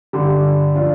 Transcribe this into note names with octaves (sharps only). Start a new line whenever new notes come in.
G2 D3 G3
F3 D4 F4